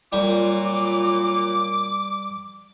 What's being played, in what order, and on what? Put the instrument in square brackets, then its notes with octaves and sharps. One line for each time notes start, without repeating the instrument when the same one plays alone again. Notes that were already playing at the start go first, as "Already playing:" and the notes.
[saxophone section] A#2 F#3 F4 [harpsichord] G3 [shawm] D6